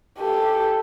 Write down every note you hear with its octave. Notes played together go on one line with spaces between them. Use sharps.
G4 A4